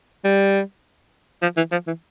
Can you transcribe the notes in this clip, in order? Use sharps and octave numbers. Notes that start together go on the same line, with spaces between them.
G3
F3
E3
F3
E3